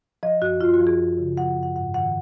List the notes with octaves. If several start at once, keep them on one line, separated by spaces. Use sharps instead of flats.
F3 D#5
F#2 F#4
F#2 F4
F#4
F3
G#4
F#2
C#3
F3 F#5
F#2
F#5
G#2 F#5
D#3 F#5